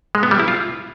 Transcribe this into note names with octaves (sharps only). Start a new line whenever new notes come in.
G#3
B3
G3
E4
F4